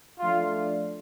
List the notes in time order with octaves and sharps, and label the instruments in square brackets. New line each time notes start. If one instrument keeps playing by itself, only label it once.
[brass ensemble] F3 A3 D4 F4